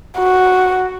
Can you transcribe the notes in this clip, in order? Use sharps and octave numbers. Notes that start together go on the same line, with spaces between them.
F#4